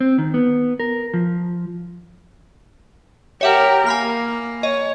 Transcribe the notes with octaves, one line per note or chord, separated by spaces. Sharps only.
C4
D#3
B3
A#4
F3
G4 A#4 C#5 E5 F#5
A#3 G#5 B5 F6
C#5 D#5